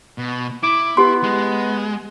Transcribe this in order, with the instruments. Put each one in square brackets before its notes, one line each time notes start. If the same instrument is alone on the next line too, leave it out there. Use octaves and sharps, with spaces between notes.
[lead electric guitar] B2
[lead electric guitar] E4 [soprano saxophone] D6
[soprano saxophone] B3 [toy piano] G4 C6
[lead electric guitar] G#3